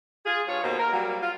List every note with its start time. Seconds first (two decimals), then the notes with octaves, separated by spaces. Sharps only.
0.25 F4 G#4
0.47 G2 F4 C#5
0.63 D#2 B2 B3 A#4 C5
0.79 A#4
0.92 F#3 G3 A#3
1.22 F4